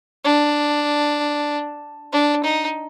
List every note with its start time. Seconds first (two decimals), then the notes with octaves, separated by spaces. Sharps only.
0.25 D4
2.12 D4
2.44 D#4